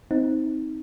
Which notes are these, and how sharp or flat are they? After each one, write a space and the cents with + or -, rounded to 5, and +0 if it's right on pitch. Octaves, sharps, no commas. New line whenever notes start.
C4 +0 D#4 +15